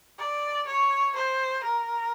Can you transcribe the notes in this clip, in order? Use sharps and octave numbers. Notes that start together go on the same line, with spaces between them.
D5
C#5
C5
A#4